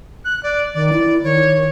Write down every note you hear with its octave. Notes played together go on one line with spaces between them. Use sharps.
F#6
D5
D#3 D5
E4
D#3 C#5